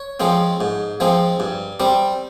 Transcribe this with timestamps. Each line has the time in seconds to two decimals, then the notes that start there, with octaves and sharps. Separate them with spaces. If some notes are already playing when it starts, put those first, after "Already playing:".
Already playing: C#5
0.20 F3 G#3 C4
0.61 G#2
1.00 F3 G#3 C4
1.40 G2
1.80 G3 C4